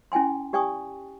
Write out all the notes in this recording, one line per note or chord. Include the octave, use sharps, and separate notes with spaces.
C#4 E4 G5 G#5 C6
G4 D5 G5 G#5 C#6 D#6